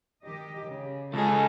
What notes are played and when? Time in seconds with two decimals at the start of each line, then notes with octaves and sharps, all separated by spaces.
0.24 D#3 G4 D#5
0.66 C#3
1.14 C#2 G#4 A4 D#5